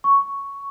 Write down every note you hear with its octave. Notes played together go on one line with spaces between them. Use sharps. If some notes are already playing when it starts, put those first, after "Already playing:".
C#6